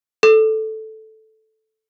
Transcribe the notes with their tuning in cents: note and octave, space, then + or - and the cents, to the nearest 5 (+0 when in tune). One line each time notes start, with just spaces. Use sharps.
A4 -5